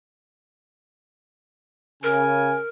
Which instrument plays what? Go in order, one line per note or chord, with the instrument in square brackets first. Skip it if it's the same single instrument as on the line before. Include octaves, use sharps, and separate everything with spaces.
[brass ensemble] C#3 G#5 [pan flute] A#4